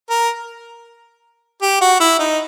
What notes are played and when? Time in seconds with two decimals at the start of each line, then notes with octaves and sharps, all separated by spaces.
0.10 A#4
1.62 G4
1.81 F#4
2.00 E4
2.19 D#4